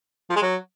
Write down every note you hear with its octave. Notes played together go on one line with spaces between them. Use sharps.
F3
G#3
F#3